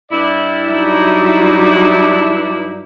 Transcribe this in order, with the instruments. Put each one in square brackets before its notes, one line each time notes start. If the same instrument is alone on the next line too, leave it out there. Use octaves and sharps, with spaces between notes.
[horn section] G2 E4 D5
[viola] F#3 D#4